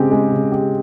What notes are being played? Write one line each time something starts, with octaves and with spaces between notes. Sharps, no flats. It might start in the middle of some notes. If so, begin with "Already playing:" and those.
Already playing: C#3 G#3 C4 G4
G#3
C#3
G4